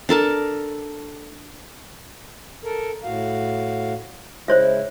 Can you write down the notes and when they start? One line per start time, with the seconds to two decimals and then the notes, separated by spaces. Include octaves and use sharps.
0.09 D4 A4 A#4 A5
2.64 A4 A#4
3.04 A2 F#4 F5
4.48 C#3 G#3 E4 C5 C#5 E5